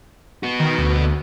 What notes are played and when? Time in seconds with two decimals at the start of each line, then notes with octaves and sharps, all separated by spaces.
0.43 B3 F#4
0.60 D#3
0.78 D2